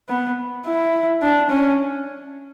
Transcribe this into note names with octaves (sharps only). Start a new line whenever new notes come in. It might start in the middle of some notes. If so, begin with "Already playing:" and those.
B3
E4
D4
C#4